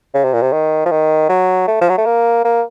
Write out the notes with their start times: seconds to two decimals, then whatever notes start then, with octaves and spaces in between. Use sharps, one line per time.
0.14 C#3
0.24 C3
0.34 A#2
0.42 C3
0.53 D#3
0.86 F3
0.91 D#3
1.29 F#3
1.68 A3
1.81 F3
1.89 F#3
1.98 A3
2.06 A#3
2.45 A#3